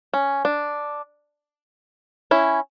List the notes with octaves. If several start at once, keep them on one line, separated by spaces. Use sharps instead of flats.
C#4
D4
C#4 E4